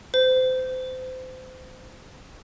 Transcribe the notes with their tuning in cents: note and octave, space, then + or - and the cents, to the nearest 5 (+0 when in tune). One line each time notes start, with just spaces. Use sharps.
C5 -30